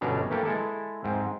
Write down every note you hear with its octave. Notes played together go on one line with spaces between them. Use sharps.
G1 B2 F#3 C#4 D4 A#5
E3 A3 A#3 G4 A4 A#4
G#3 E4 A4
G#2 C4